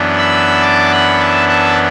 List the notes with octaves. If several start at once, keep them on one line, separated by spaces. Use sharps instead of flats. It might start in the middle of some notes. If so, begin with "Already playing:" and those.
Already playing: F#2 E3 B3 D4
B5 E6
A5 D6
F#5 B5
E5 A5
E5 A5